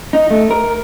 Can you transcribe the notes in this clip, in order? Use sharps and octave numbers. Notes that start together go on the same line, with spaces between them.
D#4
A3
A#4